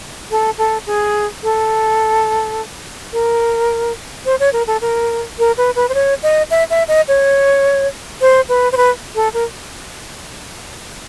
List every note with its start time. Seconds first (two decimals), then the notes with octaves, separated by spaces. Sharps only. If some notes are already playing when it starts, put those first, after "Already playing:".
0.31 A4
0.58 A4
0.86 G#4
1.43 A4
3.13 A#4
4.26 C5
4.40 C#5
4.53 A#4
4.67 A4
4.81 A#4
5.39 A#4
5.58 B4
5.76 B4
5.89 C5
5.94 C#5
6.23 D#5
6.51 E5
6.70 E5
6.88 D#5
7.08 C#5
8.21 C5
8.49 B4
8.72 C5
8.77 B4
9.15 A4
9.34 A#4